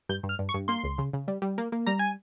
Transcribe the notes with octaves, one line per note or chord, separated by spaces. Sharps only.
G2 G6
G2
F6
G2
C#6
G2
A#3 C6
C#2
C#3
C#3
G3
G3
A#3
A#3
G3 A#5
G#5